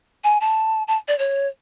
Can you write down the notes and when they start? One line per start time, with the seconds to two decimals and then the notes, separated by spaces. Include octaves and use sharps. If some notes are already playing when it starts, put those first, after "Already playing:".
0.24 G#5
0.41 A5
0.88 A5
1.08 D5
1.19 C#5